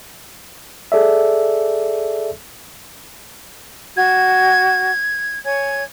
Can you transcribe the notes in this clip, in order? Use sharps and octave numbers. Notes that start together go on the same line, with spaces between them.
G#4 A4 D5 E5
F#4 G#6
C#5 G#5 G#6